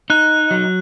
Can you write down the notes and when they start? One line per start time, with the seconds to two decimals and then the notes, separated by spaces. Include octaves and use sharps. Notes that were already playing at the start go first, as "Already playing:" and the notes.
0.10 D#4 F#6
0.51 F#3